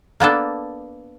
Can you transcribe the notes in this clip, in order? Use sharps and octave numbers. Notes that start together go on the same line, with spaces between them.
A#3 B3 D4 A4